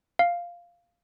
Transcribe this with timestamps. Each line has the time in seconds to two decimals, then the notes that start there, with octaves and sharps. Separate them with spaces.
0.19 F5